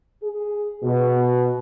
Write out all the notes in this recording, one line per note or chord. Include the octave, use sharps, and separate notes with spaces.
G#4
B2